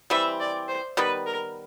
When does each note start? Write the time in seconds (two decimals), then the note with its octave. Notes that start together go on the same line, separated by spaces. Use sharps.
0.10 E3 G3 C4 E5
0.40 D5
0.68 C5
0.97 D#3 G3 B3 B4
1.26 A#4